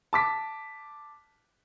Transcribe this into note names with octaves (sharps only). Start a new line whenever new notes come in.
A5 D6 B6